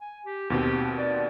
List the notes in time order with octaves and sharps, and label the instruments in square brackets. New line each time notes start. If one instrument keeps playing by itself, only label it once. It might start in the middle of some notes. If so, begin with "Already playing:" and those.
[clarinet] G#5
G4
[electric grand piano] D#2 B2 C4 [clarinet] G4
[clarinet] D5